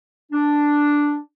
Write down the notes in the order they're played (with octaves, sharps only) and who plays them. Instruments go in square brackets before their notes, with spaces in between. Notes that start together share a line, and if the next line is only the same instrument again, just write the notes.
[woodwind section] D4